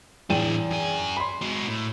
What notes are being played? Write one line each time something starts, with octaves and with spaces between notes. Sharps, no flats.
E2 A2 D4 G5 D#7
F#2 G#5
B5 C6
G#3 F#4
A2